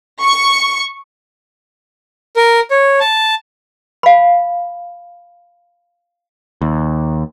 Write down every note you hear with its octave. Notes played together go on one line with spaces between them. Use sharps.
C#6
A#4
C#5
A5
F5 B5
D#2